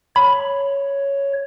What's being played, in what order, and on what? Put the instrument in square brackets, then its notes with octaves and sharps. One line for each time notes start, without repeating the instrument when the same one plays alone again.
[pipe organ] C#5 [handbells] B5